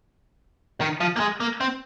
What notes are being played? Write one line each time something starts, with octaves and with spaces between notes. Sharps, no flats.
D#3
F3
A#3
G#3
A#3
C4